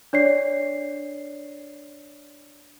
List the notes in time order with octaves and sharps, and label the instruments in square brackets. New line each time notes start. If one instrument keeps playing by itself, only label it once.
[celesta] D4 C#5 D5 C7